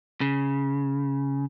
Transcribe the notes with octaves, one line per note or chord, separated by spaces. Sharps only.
C#3